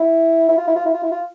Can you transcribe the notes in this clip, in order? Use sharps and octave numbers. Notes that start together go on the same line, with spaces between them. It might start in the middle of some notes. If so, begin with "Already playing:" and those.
Already playing: E4
E4
F4
E4
F4
E4
F4
E4
F4